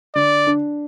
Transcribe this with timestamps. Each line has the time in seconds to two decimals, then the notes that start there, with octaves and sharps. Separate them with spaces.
0.15 D3 D5
0.47 D4